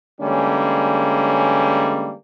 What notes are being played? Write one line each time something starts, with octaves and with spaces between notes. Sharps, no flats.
D3 E3 G3 G#3 A#3 C#4